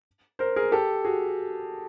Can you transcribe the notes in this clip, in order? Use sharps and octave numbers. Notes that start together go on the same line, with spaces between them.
A#4 C5
G#4 A#4
G4 A4
F#4 G#4